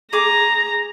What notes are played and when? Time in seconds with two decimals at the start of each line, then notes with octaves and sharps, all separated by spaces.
0.13 G#4 A#5 D6